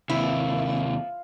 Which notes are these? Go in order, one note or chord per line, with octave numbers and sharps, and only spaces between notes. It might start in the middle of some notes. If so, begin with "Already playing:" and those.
D#2 C3 F3 E4